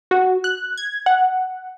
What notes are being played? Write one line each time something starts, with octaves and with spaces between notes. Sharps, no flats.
F#4
F#6
G#6
F#5